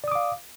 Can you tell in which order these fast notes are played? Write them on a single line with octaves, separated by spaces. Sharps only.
D5 D#6 D6 F5